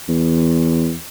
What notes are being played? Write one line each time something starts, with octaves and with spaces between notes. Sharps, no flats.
E2